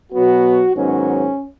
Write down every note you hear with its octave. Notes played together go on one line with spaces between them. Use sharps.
B2 F#3 B3 F#4
G#2 D#3 F#3 B3 C#4